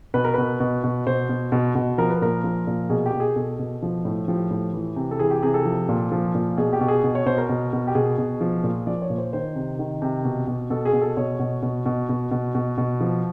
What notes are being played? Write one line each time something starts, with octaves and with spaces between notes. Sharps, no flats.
B2 B4
A#4
B2 B4
B2
B2
B2 C5
B2
B2
B2
F3 A#4
B4
A#2 A#4
F3
A#2
B2 G#4
G4
B2
G#4
B2 A4
B2
F3
A2
F3 G4
A2
E3
C3
A4
E3 G#4
G4
C3 G#4
A4
F3
A#2
F3
A#2
B2 G#4
G4
B2
G#4
B2
C#5
B2 C5
A#4
B2
B2
G4
B2 G#4
B2
F3
A#2
F3 D5
C#5
A#2
C5
D#3 C5
C3
D#3
C3
B2
B2
B2 A4
G#4
B2
A4
B2 C#5
B2
B2
B2
B2
B2
B2
B2
F3